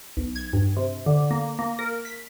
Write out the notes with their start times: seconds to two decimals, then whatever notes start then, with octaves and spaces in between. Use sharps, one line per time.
0.17 B1
0.36 G#6
0.53 G2
0.77 C3
1.06 D3
1.31 A#3
1.59 A#3
1.79 A#4
2.05 B6